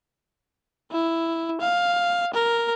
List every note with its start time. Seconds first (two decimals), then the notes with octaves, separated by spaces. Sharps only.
0.92 E4
1.61 F5
2.34 A#4